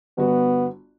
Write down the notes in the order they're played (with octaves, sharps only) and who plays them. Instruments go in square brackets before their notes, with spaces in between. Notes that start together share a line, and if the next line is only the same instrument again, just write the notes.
[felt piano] G1 F#4 [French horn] B3